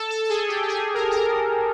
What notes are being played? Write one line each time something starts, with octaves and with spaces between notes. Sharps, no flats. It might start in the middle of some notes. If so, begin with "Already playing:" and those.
Already playing: A4
A4
A4
G#4
G4
G4
G#4
A#4
A#4